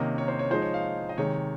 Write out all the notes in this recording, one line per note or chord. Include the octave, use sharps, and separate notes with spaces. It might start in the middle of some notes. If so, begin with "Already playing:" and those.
Already playing: C3 D#3 A#3 C#4 D#5
C#5
C5
C#5
F3 G#3 D#4 C5
C#5
F5
D#5
C3 D#3 G#3 C#5